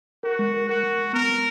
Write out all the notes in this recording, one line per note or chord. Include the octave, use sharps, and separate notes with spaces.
F#4 A#4
G#3
A#4
F#4 A#4
G#3
G#3
B3 A#4
B3